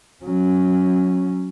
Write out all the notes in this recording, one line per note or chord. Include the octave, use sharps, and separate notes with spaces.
F#3 C#4